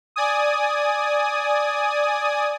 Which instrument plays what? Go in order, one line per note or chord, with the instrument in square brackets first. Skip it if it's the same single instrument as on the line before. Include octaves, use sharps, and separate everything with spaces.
[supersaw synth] D5 G#5 D#6